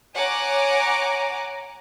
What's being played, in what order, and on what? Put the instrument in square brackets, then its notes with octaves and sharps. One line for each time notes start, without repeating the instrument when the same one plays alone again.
[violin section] C#5 F#5 G#5 A#5 D6